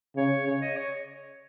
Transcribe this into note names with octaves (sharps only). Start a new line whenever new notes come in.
C#3 C#5
C#3 C#5
D#5
C#5